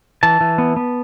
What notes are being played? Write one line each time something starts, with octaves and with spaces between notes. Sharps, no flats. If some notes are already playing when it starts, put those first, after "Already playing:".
E3 A5
E3
B3
B3